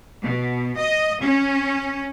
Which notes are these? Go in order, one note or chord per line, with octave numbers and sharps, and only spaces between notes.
B2
D#5
C#4